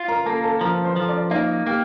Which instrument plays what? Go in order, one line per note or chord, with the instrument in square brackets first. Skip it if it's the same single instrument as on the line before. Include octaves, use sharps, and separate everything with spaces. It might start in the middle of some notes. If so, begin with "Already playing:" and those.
Already playing: [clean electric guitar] F4
[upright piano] A#4 A#5
[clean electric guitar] A#3 [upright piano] A4 A5
[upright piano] A4 A5
[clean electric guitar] F3 [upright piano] A#4 A#5
[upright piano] C5 C6
[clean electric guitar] F3
[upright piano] D5 D6
[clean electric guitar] A#3 [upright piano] D#4 D#5
[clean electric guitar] A#3 [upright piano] G4 G5